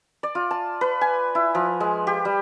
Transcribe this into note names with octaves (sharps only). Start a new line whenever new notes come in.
D5
F4
A5
B4
G#5
E4
F3
G#3
G4
G3